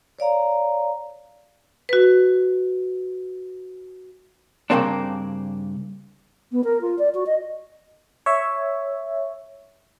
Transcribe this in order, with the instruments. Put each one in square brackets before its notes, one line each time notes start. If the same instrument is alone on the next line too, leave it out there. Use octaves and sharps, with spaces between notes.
[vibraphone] C#5 D5 F5 A#5
[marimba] F#4 B4
[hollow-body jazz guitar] G2 C#3 A#3 C4 D4
[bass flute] B3
A#4
F4
D5
F#4
D#5
[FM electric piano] C#5 E5